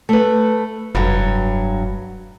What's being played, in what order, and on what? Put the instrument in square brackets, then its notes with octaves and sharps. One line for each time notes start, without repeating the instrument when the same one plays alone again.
[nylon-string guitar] A3 B4
[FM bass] F1 [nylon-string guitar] G2 F#3